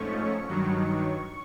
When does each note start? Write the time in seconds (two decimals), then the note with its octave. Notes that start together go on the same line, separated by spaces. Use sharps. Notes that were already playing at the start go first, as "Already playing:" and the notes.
Already playing: G#2 F3 A3 C#4 C#6
0.48 G2 D#3 F#3